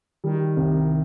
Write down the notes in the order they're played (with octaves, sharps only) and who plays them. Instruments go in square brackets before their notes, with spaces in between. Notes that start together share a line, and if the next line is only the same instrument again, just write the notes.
[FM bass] D#3 [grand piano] G3
[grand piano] C2